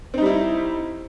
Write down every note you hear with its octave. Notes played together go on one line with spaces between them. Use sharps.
G3 C4 D#4 E4